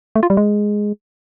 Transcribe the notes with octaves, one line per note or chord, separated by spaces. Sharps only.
A3
F4
G3
G#3